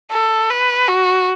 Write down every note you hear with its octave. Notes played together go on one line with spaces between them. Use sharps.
A4
B4
F#4